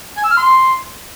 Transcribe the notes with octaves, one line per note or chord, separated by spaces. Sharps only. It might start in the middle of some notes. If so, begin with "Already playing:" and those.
G#5
E6
F6
C6